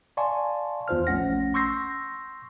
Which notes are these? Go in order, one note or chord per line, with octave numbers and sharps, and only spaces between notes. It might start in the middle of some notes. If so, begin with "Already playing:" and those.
D5 F5 G#5 A5 C6 C#6
E2 F4 C5 F6
A#1 A3 C#4 F#5 A#6
C6 C#6 E6 G6 A#6 C7